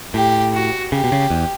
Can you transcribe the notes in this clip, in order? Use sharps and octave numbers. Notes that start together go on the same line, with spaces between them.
A2 G4
F#4
C#3 G4
B2
C#3
E2